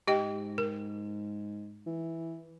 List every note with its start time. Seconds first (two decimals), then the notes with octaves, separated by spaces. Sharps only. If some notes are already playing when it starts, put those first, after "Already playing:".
0.07 G#2 G4 D#5 G5
0.58 A#4
1.86 E3